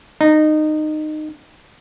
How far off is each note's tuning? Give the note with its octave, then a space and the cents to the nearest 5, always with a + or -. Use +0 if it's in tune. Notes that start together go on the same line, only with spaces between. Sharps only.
D#4 -20